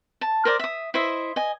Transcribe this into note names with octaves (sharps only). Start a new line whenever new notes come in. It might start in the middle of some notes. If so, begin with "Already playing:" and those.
A5
A#4 C5 D5 D#6
E5 D#6
E4 C5 D#5 E5
D#5 G#5